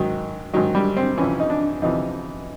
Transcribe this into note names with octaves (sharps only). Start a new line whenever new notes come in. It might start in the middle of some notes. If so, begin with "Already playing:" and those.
Already playing: G#2 D#3 F#3
G#2 D#3 F#3
G3
C4
F2 C3 E3 C#4
D#4
D4
F2 C3 E3 D#4